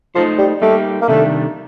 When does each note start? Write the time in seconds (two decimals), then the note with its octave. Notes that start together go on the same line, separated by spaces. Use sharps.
0.15 F3 A3 D#4 A4 C5
0.38 G3
0.62 G3 A3 A#3 D#4 G4
1.01 A#3
1.08 C3 D#3 G3 A3 D4